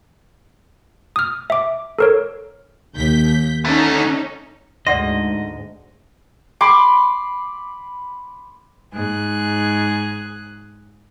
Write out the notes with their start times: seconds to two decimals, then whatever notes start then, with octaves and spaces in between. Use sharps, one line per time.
1.16 D#6 F6
1.50 E5 D6
1.99 A4 A#4 C#5
2.94 D#2 G6 B6
3.65 D3 A3 C#4 D#4 A4
4.87 D2 G#2 D5 D#5 F#5 C6
6.61 B5 C6 D6
8.93 G#2 G#4 F#6